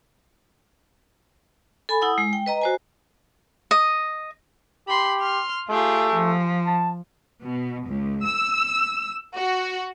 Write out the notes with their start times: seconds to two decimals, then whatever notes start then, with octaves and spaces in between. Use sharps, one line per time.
1.89 A4 G#5 B5
2.01 E4 F#5 D#6
2.18 G#3
2.33 G5
2.46 B4 D#5 A#5
2.62 F#4 C5 G#5
3.71 D#5
4.88 G4 B5 C6
5.20 C6 F6
5.69 A3 F4 G4 G#4
6.12 F3
6.66 A5
7.42 B2
7.87 C#2
8.24 E6
9.36 F#4